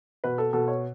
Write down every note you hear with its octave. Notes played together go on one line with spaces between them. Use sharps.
B2 B4
A4
B2 A4
C#5